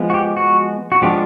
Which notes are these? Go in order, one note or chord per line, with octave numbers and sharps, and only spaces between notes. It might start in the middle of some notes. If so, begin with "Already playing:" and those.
Already playing: F3 G#3 B3
F#4
G4
F#4
F#4
F3 G#3 B3 D4 F4 G4